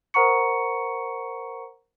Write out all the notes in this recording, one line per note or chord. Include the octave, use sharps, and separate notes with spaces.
A#4 C5 F#5 A#5 C#6 C#7